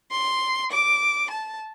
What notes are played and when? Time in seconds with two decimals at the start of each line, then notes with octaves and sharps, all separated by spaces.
0.11 C6
0.71 D6
1.30 A5